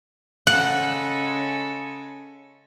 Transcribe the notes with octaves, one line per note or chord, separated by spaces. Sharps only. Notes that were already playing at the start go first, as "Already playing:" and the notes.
C#3 G#3 A4 F#5